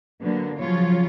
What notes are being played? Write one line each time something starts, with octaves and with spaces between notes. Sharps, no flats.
D3 F#3 A#3 B3
C#3 F3 F#3 F4 C#5